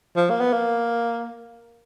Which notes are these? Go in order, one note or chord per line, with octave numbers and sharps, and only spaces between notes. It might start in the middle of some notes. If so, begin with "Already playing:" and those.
F3
A#3
B3
A#3